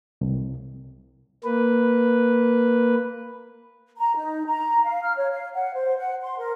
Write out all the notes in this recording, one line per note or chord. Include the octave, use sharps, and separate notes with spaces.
C2
A#3 B4
A#5
D#4
A#5
F5
F6
C#5
F5
F#5
C5
F#5
C6
A#4